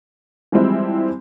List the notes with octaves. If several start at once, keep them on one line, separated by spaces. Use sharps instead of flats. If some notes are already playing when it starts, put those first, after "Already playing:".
E3 F3 G3 G#3 C4 E4